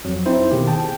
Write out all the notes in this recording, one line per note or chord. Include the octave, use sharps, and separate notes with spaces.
F2 F#3
C4 D#4 E4 C5
B2 D#3 A#3 G4 G#4
G#4 G5 A5